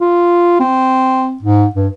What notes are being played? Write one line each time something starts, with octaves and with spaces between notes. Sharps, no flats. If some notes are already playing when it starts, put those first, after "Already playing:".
F4
C4
G#2
G2